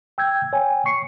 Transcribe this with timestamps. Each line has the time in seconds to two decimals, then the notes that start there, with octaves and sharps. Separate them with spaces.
0.18 G5 E6 G6 G#6
0.53 C#5 G5 G#5
0.86 C#6 C7 C#7